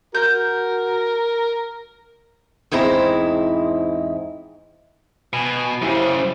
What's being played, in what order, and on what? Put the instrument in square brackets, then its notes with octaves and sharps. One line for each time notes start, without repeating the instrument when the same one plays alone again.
[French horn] F#4 [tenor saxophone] A#4 [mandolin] G6
[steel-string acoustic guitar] E2 G#2 C4 E4 A#5
[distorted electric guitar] B2 [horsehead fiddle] G#5
[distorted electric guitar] F#2 C#3 [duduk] E4 [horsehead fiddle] G4 C5